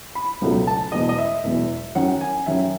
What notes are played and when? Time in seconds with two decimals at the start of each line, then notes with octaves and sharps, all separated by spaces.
0.15 B5
0.41 C#2 B2 F#3 A3 D#4
0.67 A5
0.92 E1 E2 B2 D#5
1.09 D#5
1.18 E5
1.44 E1 E2 B2
1.95 F#2 D#3 F#3 C#4 F#5
2.21 G#5
2.46 F#2 D#3 F#3 C#4 E5